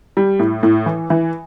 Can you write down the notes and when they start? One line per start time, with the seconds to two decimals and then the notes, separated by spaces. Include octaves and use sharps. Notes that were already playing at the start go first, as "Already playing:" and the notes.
0.17 G3
0.40 A2
0.63 A2
0.86 E3
1.10 E3